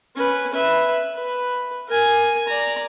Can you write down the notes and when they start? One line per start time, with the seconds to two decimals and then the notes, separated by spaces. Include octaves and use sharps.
0.16 C#4 B4
0.53 B4 E5
1.15 B4
1.88 A#4 G#5
2.48 D5 A#5